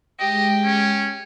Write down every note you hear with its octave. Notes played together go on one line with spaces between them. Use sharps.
G#3 G4 D#5
C#4